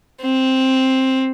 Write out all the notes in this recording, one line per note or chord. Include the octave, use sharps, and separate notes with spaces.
C4